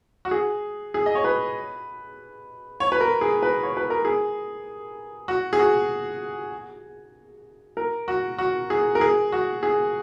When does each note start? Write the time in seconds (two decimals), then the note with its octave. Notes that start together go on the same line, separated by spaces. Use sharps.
0.25 F#4
0.31 G#4
0.94 G#4
1.06 D#5
1.15 C#5
1.24 B4
2.80 C#5
2.92 B4
3.01 A#4
3.21 G#4
3.43 B4
3.63 C#5
3.77 B4
3.90 A#4
4.05 G#4
5.28 F#4
5.53 G#4
5.59 F#4
7.77 A#4
8.08 F#4
8.38 F#4
8.70 G#4
8.95 A#4
9.01 G#4
9.32 F#4
9.63 G#4